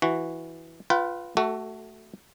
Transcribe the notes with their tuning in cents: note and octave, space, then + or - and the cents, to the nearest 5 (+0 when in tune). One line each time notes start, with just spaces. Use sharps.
E3 +0 F#4 +0
F4 +0 B4 +0 G5 -45
A3 +0 F#4 +20 A4 +25